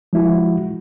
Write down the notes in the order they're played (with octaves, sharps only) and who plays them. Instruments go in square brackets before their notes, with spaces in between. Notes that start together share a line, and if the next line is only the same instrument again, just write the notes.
[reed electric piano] F3 G#3 E4 F#4